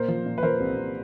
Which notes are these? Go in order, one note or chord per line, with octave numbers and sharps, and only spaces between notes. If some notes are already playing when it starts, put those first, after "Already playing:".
Already playing: A#2 A#4 C5
F3
A#2
B4
F3 A#4 C5
C2
C2